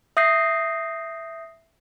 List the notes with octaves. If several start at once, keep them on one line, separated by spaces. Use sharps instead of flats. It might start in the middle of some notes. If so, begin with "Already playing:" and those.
E5 D#6 G6 A#6 C7